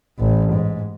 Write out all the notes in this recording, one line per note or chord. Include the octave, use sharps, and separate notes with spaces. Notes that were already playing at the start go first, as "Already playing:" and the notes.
A1
G#2